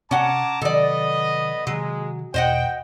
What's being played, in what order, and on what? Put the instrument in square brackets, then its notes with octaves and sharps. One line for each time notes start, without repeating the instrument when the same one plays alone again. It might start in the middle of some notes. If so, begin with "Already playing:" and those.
[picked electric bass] C3 [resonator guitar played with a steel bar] C#4 F#5 [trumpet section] A5 A#5 D6
[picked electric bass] C3 D#3 F#3 [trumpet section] B3 D#5 [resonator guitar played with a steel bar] A4 D5
[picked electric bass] C3 D#3 [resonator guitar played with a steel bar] F#3 [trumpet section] G#3
[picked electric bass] E2 B2 [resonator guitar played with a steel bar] C5 D#5 F#5 [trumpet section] G5